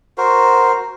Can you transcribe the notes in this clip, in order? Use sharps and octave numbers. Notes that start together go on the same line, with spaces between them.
F#4 A#4 C5